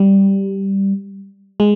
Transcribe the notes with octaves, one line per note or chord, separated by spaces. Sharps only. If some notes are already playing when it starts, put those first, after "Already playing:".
Already playing: G3
G#3